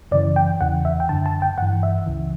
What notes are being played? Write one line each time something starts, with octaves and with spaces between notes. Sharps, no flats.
F#2 C#3 E3 D5
G5
E2 C#3 E3 F#5
E5
G5
F#2 D3 A5
A5
G5
G2 E3 F#5
E5
C#2 C#3 E3